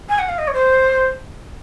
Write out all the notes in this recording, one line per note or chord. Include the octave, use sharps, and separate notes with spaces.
G#5
F#5
F5
D#5
C#5
C5